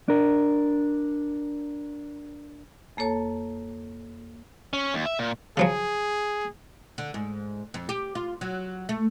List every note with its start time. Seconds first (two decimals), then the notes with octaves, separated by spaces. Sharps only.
0.08 D4 A#4
2.97 F2 A#3 A4 C#5 A5
4.73 C#4
4.94 D#2
5.06 E5
5.19 A#2
5.57 C#3 F3 F#3 G#4
6.98 D3
7.14 G#2
7.74 F2
7.89 G4
8.15 F4
8.41 F#3
8.89 A3